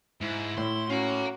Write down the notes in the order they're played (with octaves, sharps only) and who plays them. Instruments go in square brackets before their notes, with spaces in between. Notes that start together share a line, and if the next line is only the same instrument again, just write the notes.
[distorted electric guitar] G#2 [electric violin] E4
[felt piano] A2 [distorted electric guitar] C6
[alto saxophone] C#4 [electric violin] F#4 [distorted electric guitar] F5 A#5